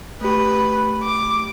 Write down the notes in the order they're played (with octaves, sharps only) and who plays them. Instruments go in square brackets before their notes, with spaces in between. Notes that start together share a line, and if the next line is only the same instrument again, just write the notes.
[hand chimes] A3 G4 [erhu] B4
[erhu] D6